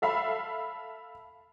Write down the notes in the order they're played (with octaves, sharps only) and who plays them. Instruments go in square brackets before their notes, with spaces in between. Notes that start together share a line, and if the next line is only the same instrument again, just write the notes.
[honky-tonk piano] A4 E5 F5 B5